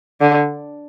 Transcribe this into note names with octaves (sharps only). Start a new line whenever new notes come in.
D3